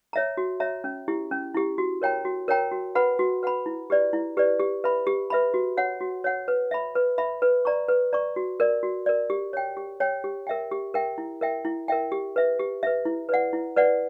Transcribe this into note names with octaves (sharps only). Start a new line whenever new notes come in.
C#5 E5 A#5
F#4
C#5 E5 A#5
C#4
E4 G4
C#4
E4 G4
F#4
A#4 C#5 G5 A#5
F#4
A#4 C#5 G5 A#5
F#4
B4 F#5 B5
F#4
B4 F#5 B5
E4
G4 B4 D5
E4
G4 B4 D5
G4
B4 E5 B5
G4
B4 E5 B5
F#4
C#5 F#5
F#4
C#5 F#5
B4
E5 B5
B4
E5 B5
B4
D5 A#5 C#6
B4
D5 A#5 C#6
F#4
A#4 D5
F#4
A#4 D5
G4
C#5 G5
G4
C#5 G5
G4
A#4 E5 G5
G4
A#4 E5 G5
E4
A#4 E5 G5
E4
A#4 E5 G5
G4
B4 E5
G4
B4 E5
E4
B4 D5 F#5
E4
B4 D5 F#5